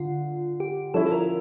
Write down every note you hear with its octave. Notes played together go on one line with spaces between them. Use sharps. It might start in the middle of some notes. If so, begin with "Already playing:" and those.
Already playing: D3 F4
G4
F3 C#4 E4 A4
A4
A#4